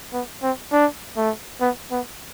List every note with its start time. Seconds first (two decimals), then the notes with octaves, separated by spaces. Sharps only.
0.13 B3
0.43 C4
0.72 D4
1.17 A3
1.61 B3
1.91 B3